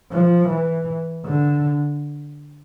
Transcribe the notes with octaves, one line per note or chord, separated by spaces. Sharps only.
F3
E3
D3